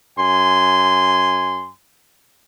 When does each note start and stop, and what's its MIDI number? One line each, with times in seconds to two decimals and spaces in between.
0.18 1.71 42
0.18 1.71 80
0.18 1.71 84